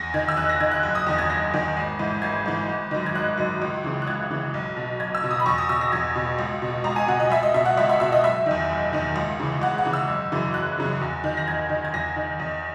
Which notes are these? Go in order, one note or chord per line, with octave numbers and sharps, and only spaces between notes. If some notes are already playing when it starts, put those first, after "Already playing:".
Already playing: E2 A#6
D#3 G#6
E6
E2 F#6
A#6
D#3 G#6
F#6
F#1
D#6
E2 D#3
G#6
F#1 A#6
E2 D#3
G#1
G#2 E3
G#1 G#6
G#2 E3
G#1
F#2 D#3
G#6
G#1 F#6
F#2 D#3
C#2
C#3 E3
F#6
C#2 G#6
C#3 E3
B1
B2
B1 G#6
E6
B2
D#6
B5
E2 C#6
D#6
B2 E6
A#6
E2 G#6
B2
C#2
B2
C#2 A#5
G#5
B2 F#5
D#5
C#2 E5
D#5
B2 E5
F#5
C#2 E5
E5
B2 E5
D#5
F#1 E5
E2 D#3
F#1
E2 D#3
C#2
C#3 E3
C#2 F#5
F#5
C#3 E3
E6
F#1
F#2 C#3 E3
F#1 F#6
F#2 C#3 E3
E2
D#3
A#6
E2 G#6
D#3
G#6
E2 A#6
D#3
E2